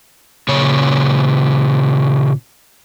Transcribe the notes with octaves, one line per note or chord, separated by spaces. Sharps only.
A#2 C#3 C#5